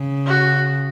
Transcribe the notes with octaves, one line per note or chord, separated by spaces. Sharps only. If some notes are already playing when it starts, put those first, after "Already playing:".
Already playing: C#3
F#4